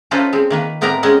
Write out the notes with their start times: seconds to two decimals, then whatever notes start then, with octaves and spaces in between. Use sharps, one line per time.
0.11 C#4 D#4 F4 A4 B4 C5
0.33 G#3 C4
0.50 D#3 A#3 B4
0.81 A2 B3 C4 A#4 D5 A#5
1.03 G#3 C4 C#4 D#5 F#5